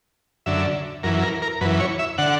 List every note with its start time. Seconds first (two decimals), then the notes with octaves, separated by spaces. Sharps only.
0.46 F#2 D3 E5
1.03 F#2 E3 A#4
1.23 A#4
1.42 A#4
1.61 F#2 B4
1.65 E3
1.80 C#5
1.99 E5
2.18 D3 F#5